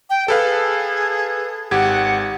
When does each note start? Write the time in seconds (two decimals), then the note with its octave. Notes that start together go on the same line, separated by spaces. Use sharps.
0.10 G5
0.28 G#4 A4 B4 F5
1.71 G#1 G4 F#5 G#6